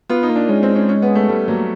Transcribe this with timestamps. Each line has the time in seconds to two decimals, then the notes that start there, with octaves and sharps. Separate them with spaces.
0.10 B3 F4
0.23 D#4
0.30 A#3
0.36 D4
0.49 G#3 C#4
0.63 C4
0.75 C#4
0.89 C#4
1.02 B3
1.15 A3
1.29 G3 A3
1.48 F#3 A#3